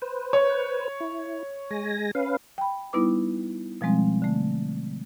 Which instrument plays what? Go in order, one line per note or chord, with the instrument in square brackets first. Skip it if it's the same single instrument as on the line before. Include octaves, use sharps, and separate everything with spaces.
[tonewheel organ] B4 C5
[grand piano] C#5
[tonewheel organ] E4
G#3 G#5 A#6
C#4 B4 F5
[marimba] G5 B5
G3 B3 D#4 E4 B4 D6
B2 F3 G3 G#3 C4
D3 A3